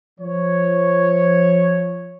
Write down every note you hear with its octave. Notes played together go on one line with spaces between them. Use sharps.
F3 C#5